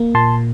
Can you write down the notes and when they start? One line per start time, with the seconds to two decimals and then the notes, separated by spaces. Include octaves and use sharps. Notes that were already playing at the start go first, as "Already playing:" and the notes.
Already playing: A#3
0.14 A#2 A5 C6